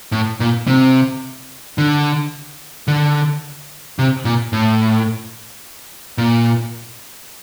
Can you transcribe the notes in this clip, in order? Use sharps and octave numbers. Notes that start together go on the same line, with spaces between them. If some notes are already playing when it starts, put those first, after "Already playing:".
A2
A#2
C3
D3
D3
C3
A#2
A2
A#2